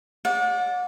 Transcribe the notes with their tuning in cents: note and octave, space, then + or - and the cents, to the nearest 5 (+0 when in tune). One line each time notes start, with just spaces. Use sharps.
D5 -15 F#5 -40